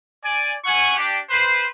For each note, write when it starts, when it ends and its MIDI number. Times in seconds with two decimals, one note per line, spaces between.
0.23 0.53 74
0.23 0.53 80
0.64 0.93 64
0.64 0.93 78
0.64 0.93 80
0.64 0.93 85
0.97 1.18 62
0.97 1.18 67
1.30 1.64 71
1.30 1.64 72